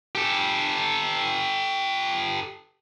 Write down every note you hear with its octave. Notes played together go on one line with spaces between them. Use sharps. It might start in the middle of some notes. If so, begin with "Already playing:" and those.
G4 A4